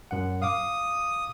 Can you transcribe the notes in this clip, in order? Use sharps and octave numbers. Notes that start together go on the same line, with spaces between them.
F#2 F#5
F5 D6 D#6